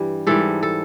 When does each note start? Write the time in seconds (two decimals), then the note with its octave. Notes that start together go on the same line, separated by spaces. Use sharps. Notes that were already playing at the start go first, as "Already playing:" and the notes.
Already playing: G2 E3 G3
0.27 G#2 E3 G3 A4
0.63 A4